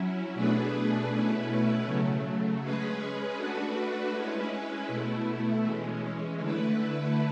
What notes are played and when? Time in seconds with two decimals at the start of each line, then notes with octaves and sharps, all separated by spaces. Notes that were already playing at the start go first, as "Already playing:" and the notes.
Already playing: F#3 C#4 E4
0.34 B2 A3 D4 G#4 B4
1.10 B2 A3 C#4 E4 B4
1.85 C#3 F#3 A3
2.61 G#3 C#4 G#4 B4
3.36 A3 D4 F#4 B4
4.12 G#3 C#4 E4 B4
4.88 B2 A3 E4
5.64 E3 G#3 C#4
6.38 D3 A3 E4 B4